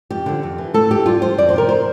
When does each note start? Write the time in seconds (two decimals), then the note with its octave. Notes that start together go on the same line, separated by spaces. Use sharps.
0.10 F2 G4
0.26 D3 F3
0.43 F2
0.58 E3
0.74 A2 A4
0.90 E3 G4
1.06 G2 F4
1.21 F3 C5
1.38 F2 D5
1.49 C5
1.54 C3 F3 A#4
1.69 C5